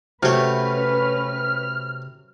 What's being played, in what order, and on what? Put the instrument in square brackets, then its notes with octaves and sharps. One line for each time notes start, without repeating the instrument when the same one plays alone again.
[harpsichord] C3 C#5 [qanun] F#3 A3 [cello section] C#4 B4 [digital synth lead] F6